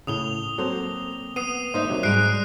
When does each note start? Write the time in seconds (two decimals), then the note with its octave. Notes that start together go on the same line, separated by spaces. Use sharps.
0.07 A2 C#3 D#6 F7 G7
0.58 F#3 A#3 C4 A4 C5
1.36 B3 D#6 C7 D#7
1.74 A#3 D4 D#4 C5 D#5 E5
1.88 C3 F#3 D#5
2.03 G#2 G3 G#3 F#6 C7 D7